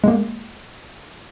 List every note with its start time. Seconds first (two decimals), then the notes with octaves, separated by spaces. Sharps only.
0.04 G#3 A#3